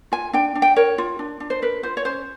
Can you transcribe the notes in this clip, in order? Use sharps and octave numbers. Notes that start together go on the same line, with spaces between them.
F4 G#5
D4 G5
D4
G5
A#4 C#5
F4
D4
D4
C5
A#4 B4
F4 C5
C#5
C#4 C5